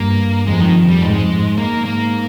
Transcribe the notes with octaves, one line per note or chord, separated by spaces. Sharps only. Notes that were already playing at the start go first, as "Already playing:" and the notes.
Already playing: G2 A#3
F2 G#3
D#3
G3
G#2 G#3
G#2 A#3
A#3